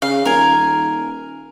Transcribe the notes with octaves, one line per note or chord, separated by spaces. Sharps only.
C#3 F5
D#1 A#4 G#5